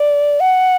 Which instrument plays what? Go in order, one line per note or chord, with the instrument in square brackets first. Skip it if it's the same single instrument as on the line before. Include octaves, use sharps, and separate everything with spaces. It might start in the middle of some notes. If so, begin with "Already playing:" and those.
Already playing: [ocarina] D5
F#5